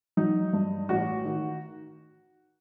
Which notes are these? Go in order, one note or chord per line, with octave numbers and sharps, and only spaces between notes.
F#3 D#4
G2
A1 F#4
D#3